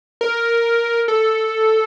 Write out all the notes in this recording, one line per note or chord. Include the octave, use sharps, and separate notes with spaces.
A#4
A4